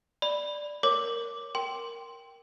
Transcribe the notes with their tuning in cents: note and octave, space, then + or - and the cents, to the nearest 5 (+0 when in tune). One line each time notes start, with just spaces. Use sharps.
D5 +0 B5 +0
A#4 +0 C#5 +0 D6 +0
A#4 +0 G5 +0 C6 +0